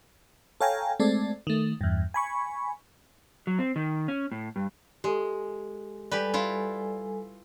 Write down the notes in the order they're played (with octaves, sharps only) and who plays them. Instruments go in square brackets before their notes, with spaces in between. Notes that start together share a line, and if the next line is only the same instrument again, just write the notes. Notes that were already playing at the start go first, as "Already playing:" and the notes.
[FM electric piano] A4 C#5 F5 G5 G#5 A#5
G#3 A3 C4 A4 D5
D#3 A3
E2 G2
G#5 B5 C#6
[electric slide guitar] F#3
C4
D#3
C#4
A2
G2
[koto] G#3 [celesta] G4 A4
[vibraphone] G3 A4 G#5 [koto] G4 B4 [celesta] D5
[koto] E4 F4